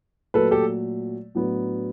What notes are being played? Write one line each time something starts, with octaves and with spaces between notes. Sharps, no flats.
A#2 F#3 A3 A4 B4
G4 A4
A2 F#3 B3 D4